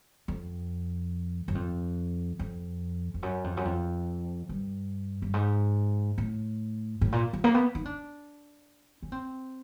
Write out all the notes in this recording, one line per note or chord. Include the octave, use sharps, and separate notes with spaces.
F2
F#2
F2
F2
F2
F#2
F2
F#2
F2
G2
G2
G#2
A2
A2
A#2
F3
A#3
B3
D#4
D4
C#4
C4